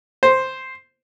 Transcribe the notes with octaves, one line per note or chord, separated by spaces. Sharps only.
C5